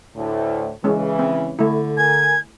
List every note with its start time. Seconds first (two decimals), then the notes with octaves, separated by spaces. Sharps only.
0.15 D2 A2
0.84 C#3 E3 G#3 C#4
1.19 C4
1.59 D3 A3 E4
1.98 A#4 G#5 G#6